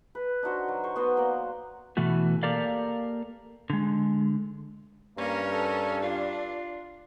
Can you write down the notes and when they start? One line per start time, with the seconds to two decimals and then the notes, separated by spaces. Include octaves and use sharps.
0.15 B4
0.43 D4 D#4 F#4 C5
0.68 F#3
0.84 C5 C#6
0.96 B3 C5 D#5
1.17 A#3 D5 A#5
1.97 B2 E3 A3 F#4
2.43 A#3 G4 A4 A#4 D5 F5
3.70 D3 G#3
5.18 G2 A#3 C#4 A#4
5.52 A4
6.03 D4 F4